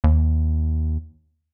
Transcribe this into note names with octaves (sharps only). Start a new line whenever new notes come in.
D#2